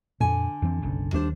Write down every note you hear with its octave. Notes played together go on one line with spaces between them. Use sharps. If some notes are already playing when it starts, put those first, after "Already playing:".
F2 A#2 D3 G#5
F2 E3 C4
F#1 B1 C#3
D#2 G3 D4 C5